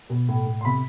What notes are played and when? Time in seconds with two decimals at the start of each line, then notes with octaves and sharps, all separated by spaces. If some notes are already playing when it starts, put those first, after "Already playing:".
0.09 B2
0.28 A2
0.46 A2
0.61 C6
0.65 C3 B5